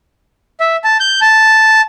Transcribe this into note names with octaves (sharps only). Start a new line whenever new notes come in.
E5
A5
G6
A5